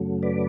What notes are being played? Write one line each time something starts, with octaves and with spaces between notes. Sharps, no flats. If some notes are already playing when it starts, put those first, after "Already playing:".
Already playing: F#2 C#3 F#3 A3
B4 D5